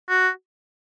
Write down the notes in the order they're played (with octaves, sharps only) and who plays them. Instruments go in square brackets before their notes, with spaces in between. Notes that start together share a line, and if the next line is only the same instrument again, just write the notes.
[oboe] F#4